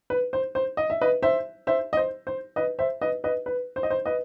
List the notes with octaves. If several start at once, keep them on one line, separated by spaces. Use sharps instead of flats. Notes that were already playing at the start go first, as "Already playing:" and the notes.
B4
C5
C5
D#5
E5
B4 D#5
C5 E5
C5 E5
D#5
C5
C5
B4 D#5
C5 E5
B4 D#5
B4 D#5
B4
C5
D#5
C5
B4 D#5